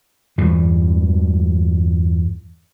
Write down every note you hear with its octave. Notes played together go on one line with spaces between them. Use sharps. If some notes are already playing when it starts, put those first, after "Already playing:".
E2 G2 E3 G3